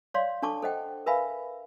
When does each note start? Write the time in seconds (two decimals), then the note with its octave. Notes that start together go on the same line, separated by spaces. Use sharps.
0.14 C#5 D5 F5 C6
0.42 D4 A4 A5 C#6 D6
0.62 A4 C5 D#5 F#5 G5
1.06 A#4 B4 E5 F5 G#5 B5